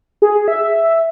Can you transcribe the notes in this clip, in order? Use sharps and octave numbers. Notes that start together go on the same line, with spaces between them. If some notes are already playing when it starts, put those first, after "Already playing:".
G#4
E5